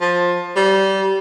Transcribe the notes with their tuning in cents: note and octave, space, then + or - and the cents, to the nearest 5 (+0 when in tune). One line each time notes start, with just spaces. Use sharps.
F3 +15
G3 -20